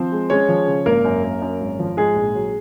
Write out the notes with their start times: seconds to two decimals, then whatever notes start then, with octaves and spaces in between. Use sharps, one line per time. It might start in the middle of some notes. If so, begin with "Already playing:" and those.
Already playing: F3 C4 C5
0.12 G#3
0.30 G#3 C#4 C#5
0.49 F3
0.67 C#3
0.86 G#1 A#3 A#4
1.04 F#2
1.24 A#3
1.42 F#2
1.61 G#1
1.79 F3
1.97 G#2 G#3 G#4
2.16 A#1
2.35 F#3